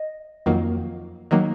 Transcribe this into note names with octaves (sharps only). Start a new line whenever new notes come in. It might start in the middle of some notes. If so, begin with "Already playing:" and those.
Already playing: D#5
F2 D#3 F#3 A#3
D#3 F#3 A#3